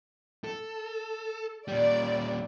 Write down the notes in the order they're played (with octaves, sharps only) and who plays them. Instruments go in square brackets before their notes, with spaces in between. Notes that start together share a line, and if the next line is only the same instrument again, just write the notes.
[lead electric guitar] A4
[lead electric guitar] A#2 G3 [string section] D5